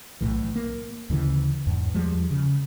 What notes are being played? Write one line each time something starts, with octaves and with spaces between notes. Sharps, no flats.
B1 A2 E3
A#3
D2 C#3 E3
E2 G#2
E2 F3 G3 G#3
C#3